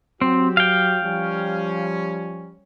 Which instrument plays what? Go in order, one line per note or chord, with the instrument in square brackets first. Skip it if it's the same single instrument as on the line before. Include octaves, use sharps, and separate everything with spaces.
[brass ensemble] F#3 F#4 G4 [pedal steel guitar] C4
[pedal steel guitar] F5 G5
[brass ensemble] F3 G3 C#4